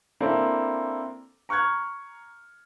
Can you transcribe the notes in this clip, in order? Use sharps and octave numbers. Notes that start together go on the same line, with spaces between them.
A#3 C4 D4 E4 A4
A#5 C#6 F6 F#6 G#6